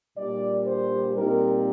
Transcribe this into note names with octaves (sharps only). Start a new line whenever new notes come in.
A#2 G3 D4 D5
C5
A#2 G3 C4 D#4 A#4